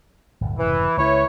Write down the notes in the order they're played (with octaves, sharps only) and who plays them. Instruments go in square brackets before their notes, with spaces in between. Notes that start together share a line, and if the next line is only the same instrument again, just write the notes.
[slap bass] D1 G1 D2
[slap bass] F1 G#2 C#3 [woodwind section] E3
[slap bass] C#2 [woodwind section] E4 B4 C#5